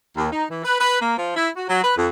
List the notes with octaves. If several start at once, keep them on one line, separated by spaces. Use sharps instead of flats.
D#2
D#4
E3
B4
B4
A#3
F3
E4
F#4
F#3
B4
F2